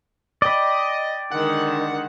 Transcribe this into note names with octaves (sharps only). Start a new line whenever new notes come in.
D5 D#5 G5 B5
D3 D#3 G#3 F#5